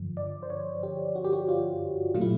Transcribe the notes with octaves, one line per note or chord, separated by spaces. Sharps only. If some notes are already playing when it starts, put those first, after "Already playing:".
Already playing: G2 D3 F3
D5
C5
C#5
G4
F#4
G4
F#4
F4
A#2 F#3 A3 F4
E4